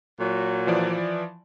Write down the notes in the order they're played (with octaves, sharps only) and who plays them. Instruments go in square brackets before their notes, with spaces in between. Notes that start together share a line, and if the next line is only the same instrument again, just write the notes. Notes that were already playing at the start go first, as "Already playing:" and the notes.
[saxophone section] A#2 F#3
[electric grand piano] E3 F3 D5